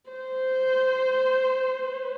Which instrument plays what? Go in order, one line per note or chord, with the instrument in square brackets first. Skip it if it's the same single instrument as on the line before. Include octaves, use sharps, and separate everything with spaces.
[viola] C5